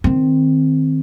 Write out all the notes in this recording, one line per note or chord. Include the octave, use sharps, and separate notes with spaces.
D#3 C4